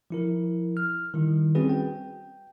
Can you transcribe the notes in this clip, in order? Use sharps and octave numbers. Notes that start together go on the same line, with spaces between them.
F3 E4 A#4
F6
D#3 G3 E4
G3 C4 C#4 F#4 G#4 B4
G5